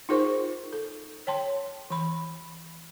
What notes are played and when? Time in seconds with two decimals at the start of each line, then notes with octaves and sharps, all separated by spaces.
0.09 D#4 F4 G#4 A#4 C5 C#6
0.73 A4
1.27 C#5 G5 A5 C6
1.90 E3 B5